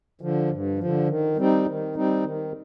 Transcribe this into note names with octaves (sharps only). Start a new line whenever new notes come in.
D3 F3
G2
D3 F3
D#3
G3 C4 D#4
D#3
G3 C4 D#4
D#3